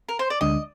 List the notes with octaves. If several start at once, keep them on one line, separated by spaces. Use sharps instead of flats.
A#4
C5
D5
D2 D3 G#3 D4 D#5